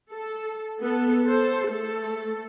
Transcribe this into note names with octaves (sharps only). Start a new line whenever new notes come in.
A4
B3 A4
A4 C5
A3 A4